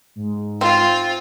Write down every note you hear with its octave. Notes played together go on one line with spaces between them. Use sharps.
G#2
C4 F4